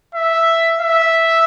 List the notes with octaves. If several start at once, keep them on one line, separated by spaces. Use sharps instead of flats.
E5
E5